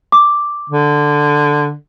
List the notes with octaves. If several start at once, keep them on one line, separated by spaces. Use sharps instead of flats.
D6
D3